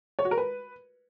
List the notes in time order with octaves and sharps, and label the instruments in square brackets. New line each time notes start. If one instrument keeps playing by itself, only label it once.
[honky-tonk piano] C#5
F#4
A#4
B4